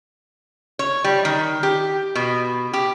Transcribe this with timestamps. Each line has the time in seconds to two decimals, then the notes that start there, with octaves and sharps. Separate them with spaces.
0.79 C#5
1.04 G3
1.25 D#3
1.63 G4
2.15 B2
2.73 G4